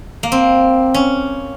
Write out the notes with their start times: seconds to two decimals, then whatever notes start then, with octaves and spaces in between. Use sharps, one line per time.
0.23 A#3
0.32 C4
0.94 C#4